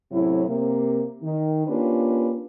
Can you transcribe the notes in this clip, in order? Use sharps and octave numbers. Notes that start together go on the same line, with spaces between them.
F#2 A2 C3 F#3 E4
C3 A#3
D#3
A#3 C#4 D4 F4 G4 B4